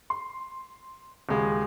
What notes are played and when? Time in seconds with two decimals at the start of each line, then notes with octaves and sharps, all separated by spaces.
0.10 C6
1.29 D#1 C#3 G#3